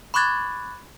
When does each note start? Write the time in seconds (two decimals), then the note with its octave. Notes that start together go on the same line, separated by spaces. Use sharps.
0.14 B5 C#6 D6 F#6 G#6 A6